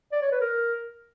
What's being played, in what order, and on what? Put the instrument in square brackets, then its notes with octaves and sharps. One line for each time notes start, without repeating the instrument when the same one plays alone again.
[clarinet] D5
C#5
B4
A#4